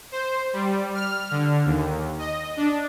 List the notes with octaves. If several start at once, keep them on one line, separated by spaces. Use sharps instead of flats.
C5
G3
F6
D3
D#2
D#5
D4